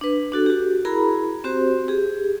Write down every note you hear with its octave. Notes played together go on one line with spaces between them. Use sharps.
D4 B4
D4 F#4 A4
F#4 G4
E4 F#4 G#4 A#4 A#5 B5
C4 F#4 G4 C5
G4 G#4